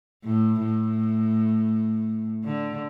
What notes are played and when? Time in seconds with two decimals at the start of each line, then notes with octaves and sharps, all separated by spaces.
0.24 A2
0.61 A2
2.44 D3